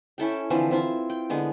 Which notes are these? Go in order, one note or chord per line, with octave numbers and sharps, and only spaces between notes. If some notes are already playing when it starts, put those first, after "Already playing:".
C#4 E4 A4 G5
D3 E3 F3 C4
C4 E4 F4
G5
D3 G#3 B3